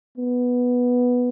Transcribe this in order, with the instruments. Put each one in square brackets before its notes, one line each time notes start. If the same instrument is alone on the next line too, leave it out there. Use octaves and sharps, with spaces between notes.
[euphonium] B3